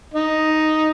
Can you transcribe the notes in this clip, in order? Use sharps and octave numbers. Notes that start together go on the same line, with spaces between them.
D#4